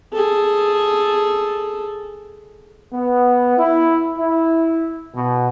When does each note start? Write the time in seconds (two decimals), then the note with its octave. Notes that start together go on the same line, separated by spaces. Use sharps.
0.13 G#4 A4
2.93 B3
3.58 E4
4.17 E4
5.15 B2